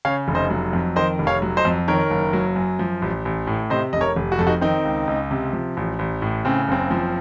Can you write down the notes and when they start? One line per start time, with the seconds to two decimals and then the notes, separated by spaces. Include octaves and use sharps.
0.05 C#3 C#5 F5
0.28 F1
0.35 C5 D#5
0.50 F#3
0.73 F2
0.96 D#3 C5 D#5
1.19 F1
1.27 C#5 F5
1.42 F#3
1.57 C5 D#5
1.65 F2
1.88 D#3 A#4 C#5
2.11 F#1
2.33 F#3
2.56 F#2
2.79 F3
3.02 A1
3.25 A1
3.47 A2
3.70 C3 C5 D#5
3.93 F1 D#5
4.01 A#4 C#5
4.16 F1
4.32 F#4
4.39 F2 A4
4.47 D#4 F#4
4.61 D#3 C4 D#4
4.85 C#2
5.07 C#2
5.31 C3
5.53 F3
5.77 A1
5.99 A1
6.22 A2
6.45 C#3 C4
6.68 F#1 C4
6.91 F3